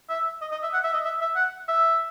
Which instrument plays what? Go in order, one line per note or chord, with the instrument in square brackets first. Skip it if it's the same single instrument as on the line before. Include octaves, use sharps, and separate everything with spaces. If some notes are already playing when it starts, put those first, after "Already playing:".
[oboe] E5
D#5
D#5
E5
F#5
E5
D#5
E5
E5
F#5
E5